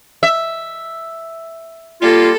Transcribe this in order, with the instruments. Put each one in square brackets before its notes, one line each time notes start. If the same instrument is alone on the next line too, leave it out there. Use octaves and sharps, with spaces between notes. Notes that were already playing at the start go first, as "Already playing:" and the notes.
[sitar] E5
[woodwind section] G3 A#3 F4 [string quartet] A4